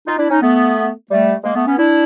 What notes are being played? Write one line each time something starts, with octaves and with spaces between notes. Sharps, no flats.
D#4 F4
D4 E4
C#4 D#4
A3 B3
G3 A3
G#3 A#3
A3 B3
B3 C#4
D4 E4